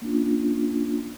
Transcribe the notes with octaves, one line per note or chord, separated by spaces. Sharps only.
A#3 C#4 D4 F4